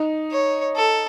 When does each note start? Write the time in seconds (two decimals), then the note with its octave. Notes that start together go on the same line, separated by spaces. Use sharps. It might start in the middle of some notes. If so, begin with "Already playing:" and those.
Already playing: D#4
0.32 C#5
0.76 A4